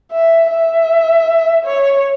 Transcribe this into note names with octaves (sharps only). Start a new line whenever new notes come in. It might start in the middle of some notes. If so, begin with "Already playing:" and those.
E5
E5
C#5